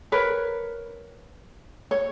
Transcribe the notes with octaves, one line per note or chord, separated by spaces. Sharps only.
A#4 B4 C#5
C#5